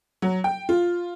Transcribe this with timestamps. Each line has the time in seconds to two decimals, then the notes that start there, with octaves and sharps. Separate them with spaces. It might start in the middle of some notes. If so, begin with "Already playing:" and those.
0.22 F#3
0.44 G5
0.69 F4